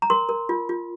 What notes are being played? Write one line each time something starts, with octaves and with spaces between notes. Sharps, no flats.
A#5
A#4 C6
A#4
F4
F4